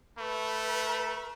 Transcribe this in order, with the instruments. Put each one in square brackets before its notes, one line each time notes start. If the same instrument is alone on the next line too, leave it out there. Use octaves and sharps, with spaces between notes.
[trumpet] A3 [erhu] B4